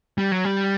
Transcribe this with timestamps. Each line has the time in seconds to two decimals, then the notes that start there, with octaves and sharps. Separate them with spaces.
0.18 G3
0.32 F#3
0.45 G3